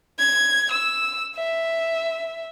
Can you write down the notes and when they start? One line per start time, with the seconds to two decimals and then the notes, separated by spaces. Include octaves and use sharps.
0.19 G#6
0.72 E6
1.36 E5